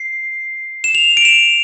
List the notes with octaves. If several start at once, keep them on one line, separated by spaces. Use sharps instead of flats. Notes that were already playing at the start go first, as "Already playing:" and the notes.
Already playing: C7
E7
F7
D7
E7